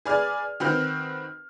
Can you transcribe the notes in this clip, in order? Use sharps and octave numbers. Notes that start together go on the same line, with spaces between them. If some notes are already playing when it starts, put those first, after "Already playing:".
G#4 B4 D5 F6
D#3 C4 F#4 B4 F6 G6